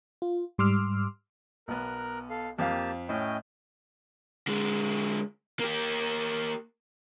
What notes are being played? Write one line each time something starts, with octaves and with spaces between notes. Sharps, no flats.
F4
G#2 G3 C6 D6 E6 F6
B1 B3 A#4 F#6
A4 F5
F2 A#3 G4 F5 A5
A2 C#4 D#5 G5
D3 G#3
A#3 G4